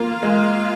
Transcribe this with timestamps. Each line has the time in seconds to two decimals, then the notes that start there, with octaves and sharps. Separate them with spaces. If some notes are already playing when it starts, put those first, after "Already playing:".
Already playing: A#3 F4
0.23 G#3